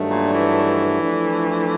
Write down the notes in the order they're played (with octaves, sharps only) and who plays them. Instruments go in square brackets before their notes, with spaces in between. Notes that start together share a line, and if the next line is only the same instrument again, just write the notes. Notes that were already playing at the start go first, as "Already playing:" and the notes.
Already playing: [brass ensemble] G2 D#3 F#3 A3 D4
[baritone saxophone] A#2
E3
[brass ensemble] F3 A3 D4